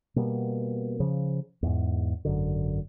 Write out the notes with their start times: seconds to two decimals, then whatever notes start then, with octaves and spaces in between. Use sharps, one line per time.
0.16 B2 G3 A#3 B3
1.00 C#3 F3
1.63 E2 G#2
2.25 G#1 F#2 D3